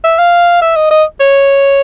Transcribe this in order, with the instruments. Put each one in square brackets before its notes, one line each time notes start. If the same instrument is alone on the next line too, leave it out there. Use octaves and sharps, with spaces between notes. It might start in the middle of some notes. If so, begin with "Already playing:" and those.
[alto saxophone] E5
F5
E5
D#5
D#5
C#5